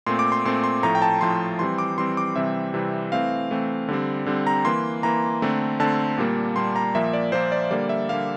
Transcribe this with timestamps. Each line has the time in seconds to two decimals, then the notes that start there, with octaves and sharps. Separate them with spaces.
0.06 A#2 A3 C4 C6
0.19 D6
0.32 C6
0.45 A#2 A3 C4 C6
0.64 C6
0.83 A2 F3 A3 A#5
0.95 G5
1.02 A5
1.21 A2 F3 A3 C6
1.59 E3 G3 C4 C6
1.78 D6
1.97 E3 G3 C4 C6
2.17 D6
2.36 C3 E3 G3 C4 E5
2.74 C3 E3 G3 C4
3.12 E3 A3 C4 F5
3.51 E3 A3 C4
3.88 D3 G3 C4
4.26 D3 G3 C4
4.47 A#5
4.65 E3 A#3 C6
5.03 E3 A#3 A#5
5.42 D3 A3 C4
5.80 D3 A3 C4 A5
6.18 A#2 G3 A#3
6.56 A#2 G3 A#3 C6
6.76 A#5
6.95 A#2 F3 A#3 E5
7.13 D5
7.32 A#2 F3 A#3 C5
7.52 D5
7.71 D3 G3 A#3 D5
7.89 E5
8.09 D3 G3 A#3 F5